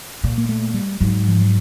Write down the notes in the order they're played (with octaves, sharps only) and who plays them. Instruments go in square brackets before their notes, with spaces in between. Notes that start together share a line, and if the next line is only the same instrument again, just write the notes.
[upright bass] A#2
[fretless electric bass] A#3
A3
G3
[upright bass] G#2 [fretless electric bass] F#3
[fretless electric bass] F3
F#3